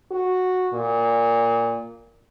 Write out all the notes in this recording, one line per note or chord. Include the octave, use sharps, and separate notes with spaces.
F#4
A#2